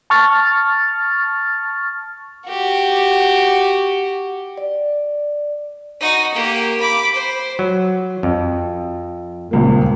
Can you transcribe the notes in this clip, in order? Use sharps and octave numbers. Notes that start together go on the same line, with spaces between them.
A5 C#6 F6 A6
F#4 G4
D5
D#4 F#4
A#3 G4
B5 D6
C5
F#3
F2
D#1 C#2 A#3